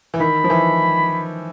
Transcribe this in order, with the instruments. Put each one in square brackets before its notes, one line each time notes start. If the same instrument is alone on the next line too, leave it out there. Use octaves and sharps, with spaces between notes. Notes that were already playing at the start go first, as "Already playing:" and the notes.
[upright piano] E3
[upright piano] D#3 [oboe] B5
[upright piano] F3
E3